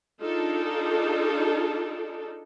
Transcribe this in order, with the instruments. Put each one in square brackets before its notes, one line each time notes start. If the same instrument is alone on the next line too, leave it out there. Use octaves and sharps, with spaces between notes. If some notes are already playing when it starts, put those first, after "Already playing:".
[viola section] D4 D#4 F4 G#4 A4